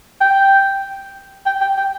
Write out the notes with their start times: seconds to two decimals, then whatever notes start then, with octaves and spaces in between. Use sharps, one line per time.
0.21 G5
1.46 G5
1.61 G5
1.77 G5